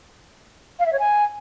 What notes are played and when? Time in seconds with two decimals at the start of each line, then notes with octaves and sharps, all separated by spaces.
0.79 F5
0.86 E5
0.93 C#5
0.99 G#5